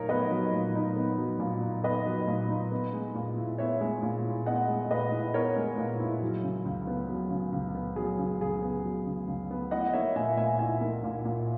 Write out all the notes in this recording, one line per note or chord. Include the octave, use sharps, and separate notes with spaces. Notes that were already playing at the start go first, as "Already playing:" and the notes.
Already playing: A#2 F#3 D#4 A#4 C#5
B3 B4 D#5
F#3
A#2
D#4
B3
F#3
A#2
D#4
B3 B4 D#5
F#3
A#2
D#4
B3
G#3
A#2
E4
B3 C#5 E5
G#3
A#2
E4
B3 D#5 F#5
G#3
A#2 B4 D#5
E4
B3 A#4 C#5
G#3
A#2
E4
F#3
C#3
C#2
B3
F#3
C#3
C#2
B3
F#3 G#4
C#3
C#2 G#4
B3
F#3
C#3
C#2
B3
E4 D#5 F#5
A#3 C#5 E5
A#2 E5 G#5
A#2 E5 G#5
E4 E5 G#5
A#3
A#2
A#2